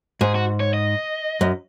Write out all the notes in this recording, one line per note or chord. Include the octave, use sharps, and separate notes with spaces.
G#2 G#4
F#4
C#5
D#5
F#2